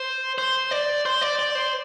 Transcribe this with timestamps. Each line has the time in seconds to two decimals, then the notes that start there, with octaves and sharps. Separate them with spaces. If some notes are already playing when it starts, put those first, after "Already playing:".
Already playing: C5
0.38 C5
0.71 D5
1.05 C5
1.21 D5
1.39 D5
1.55 C5